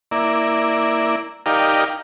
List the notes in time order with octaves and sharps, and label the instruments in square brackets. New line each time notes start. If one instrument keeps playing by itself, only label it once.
[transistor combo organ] A#3 E4 D5
D#4 G4 A#4 D5 F5